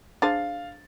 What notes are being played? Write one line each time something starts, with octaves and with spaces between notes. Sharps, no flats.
D4 G#4 C5 F5 A6